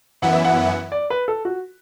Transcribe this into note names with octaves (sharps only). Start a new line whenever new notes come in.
F#2 E3 B3 E4 F#5
E5
F#5
D5
B4
A4
F#4